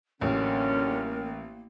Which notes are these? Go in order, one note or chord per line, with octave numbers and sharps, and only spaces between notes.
A1 D3 F#3 A#3 C#4 A#4